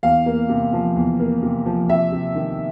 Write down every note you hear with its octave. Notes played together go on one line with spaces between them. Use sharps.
E2 F5
A#3
C3
F3
E2
A#3
C3
F3
C3 E5
C3
D#3